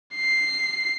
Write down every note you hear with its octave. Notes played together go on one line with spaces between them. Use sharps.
C7